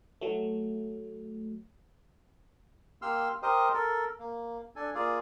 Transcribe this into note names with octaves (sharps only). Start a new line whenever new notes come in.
F#3 A3
A#3 G4 C6 E6 F6
G4 A#4 C5 D#5
A4 A#4
A#3
D4 A4 G#5
A#3 F4 G#4 D5